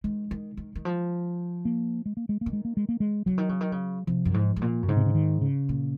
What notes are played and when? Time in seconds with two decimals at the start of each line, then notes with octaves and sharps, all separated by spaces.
0.04 D#3 G#3
0.31 D#3
0.57 D#3
0.75 D#3
0.85 F3
1.65 A#3
2.06 G#3
2.17 A#3
2.29 G#3
2.41 A#3
2.46 D#3
2.53 G#3
2.65 A#3
2.77 G#3
2.89 A#3
3.00 G#3
3.26 C#3 F#3
3.38 D#3
3.49 C#3
3.61 D#3
3.72 C#3
4.07 C3 F3
4.25 F#2
4.34 G#2
4.56 G#2
4.61 A#2
4.83 F#2
4.88 G#2 C#3
4.97 C3
5.06 C#3
5.14 D#3
5.42 C#3
5.69 A#2